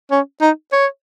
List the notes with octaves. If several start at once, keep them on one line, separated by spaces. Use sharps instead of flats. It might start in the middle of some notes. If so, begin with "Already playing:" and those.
C#4
D#4
C#5